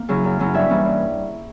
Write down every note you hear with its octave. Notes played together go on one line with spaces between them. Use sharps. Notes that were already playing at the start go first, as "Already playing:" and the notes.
Already playing: A#3
C#3 F#3 C#4 E4
F#2
C#3 F#3 C#4 E4
G2 C#5 E5
E3 G3 A#3 C#4
G2